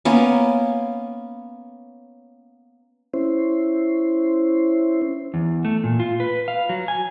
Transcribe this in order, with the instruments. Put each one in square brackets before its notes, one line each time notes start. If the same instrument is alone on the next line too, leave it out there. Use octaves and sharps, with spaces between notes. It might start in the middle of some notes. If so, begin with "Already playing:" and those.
[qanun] A#3 B3 C#4
[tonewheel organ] C#4 E4 C5
[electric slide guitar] E2
A3
A#2
F4
B4
F5
F#3
G#5